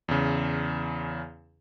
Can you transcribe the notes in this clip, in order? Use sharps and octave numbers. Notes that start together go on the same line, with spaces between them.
E2 C#3